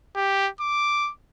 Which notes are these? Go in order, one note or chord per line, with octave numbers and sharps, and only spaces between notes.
G4
D6